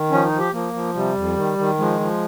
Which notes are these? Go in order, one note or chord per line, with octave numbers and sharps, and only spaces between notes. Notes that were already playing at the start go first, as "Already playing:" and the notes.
Already playing: D#3
F3 C#4
D#4
F3
G4
F3 A#3
F3
C3 G3
F2
D#3
D#3
F3 G#3
F3